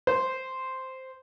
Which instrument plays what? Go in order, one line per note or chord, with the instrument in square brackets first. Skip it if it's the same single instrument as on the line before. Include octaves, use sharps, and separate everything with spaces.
[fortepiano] C5